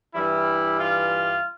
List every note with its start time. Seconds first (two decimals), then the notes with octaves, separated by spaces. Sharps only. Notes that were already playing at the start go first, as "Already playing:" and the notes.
0.14 G2 E3 G3 E4
0.78 F4